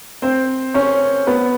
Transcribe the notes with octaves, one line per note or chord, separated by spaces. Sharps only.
C4 C5
C#4 C#5
B3 B4